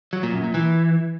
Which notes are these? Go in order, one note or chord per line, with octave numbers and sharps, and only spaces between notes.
F#3
A#2
F#2
A#2
E3